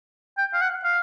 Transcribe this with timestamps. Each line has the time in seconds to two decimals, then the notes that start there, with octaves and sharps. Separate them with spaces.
0.38 G5
0.54 F5
0.61 F#5
0.84 F5